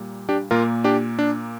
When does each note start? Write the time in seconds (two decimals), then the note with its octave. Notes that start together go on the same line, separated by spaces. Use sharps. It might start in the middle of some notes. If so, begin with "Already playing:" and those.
Already playing: A#2 G3 A#3
0.29 D4 G4
0.51 A#2 A#3 F4 A#4
0.84 D4 G4
1.19 D4